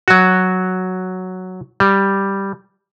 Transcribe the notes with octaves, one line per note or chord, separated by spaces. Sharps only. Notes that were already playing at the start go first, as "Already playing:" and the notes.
F#3 F#4
G3